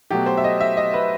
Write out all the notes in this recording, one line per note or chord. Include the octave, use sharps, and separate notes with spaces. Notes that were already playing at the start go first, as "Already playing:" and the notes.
B2 F#3 A3 G4
C5
E5
D#5
E5
D#5
B4